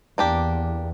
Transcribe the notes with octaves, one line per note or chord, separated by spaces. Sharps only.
E2 A#3 D4 G4